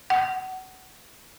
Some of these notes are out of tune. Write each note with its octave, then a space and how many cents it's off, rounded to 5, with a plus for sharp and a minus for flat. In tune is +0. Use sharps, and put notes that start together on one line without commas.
F#5 +20